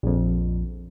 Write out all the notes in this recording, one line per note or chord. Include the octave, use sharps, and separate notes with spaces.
A#1 F2